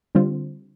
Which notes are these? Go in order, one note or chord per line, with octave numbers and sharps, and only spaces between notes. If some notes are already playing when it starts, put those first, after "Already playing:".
D3 G3 C4 F4 C5